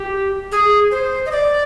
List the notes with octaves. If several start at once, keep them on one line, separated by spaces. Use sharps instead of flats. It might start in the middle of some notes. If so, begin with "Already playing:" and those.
Already playing: G4
G#4
C5
D#5
D5